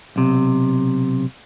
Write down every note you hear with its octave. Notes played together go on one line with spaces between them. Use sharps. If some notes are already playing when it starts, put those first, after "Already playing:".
B1 C3